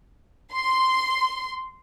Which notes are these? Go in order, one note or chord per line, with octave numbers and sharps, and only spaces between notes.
C6